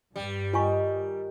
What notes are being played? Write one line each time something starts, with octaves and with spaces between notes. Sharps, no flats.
G2 G3
D#3 F4 G#5 C#6